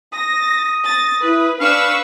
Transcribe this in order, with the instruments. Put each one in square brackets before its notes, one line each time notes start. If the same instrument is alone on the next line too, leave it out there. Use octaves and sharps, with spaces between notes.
[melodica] D#6 [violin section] A#6
[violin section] A6 A#6
[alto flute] E4 [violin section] B4
[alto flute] D4 [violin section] B4 C#6 E6 [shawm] F5